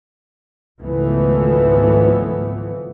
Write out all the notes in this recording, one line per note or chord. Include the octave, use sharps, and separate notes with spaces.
G#1 C#2 E3 F3 A3 B3